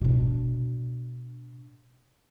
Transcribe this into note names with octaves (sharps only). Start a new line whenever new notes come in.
B2 D4